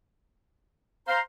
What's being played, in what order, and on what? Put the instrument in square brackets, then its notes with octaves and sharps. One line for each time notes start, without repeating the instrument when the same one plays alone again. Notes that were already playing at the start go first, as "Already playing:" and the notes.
[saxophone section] C5 [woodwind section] F5 A#5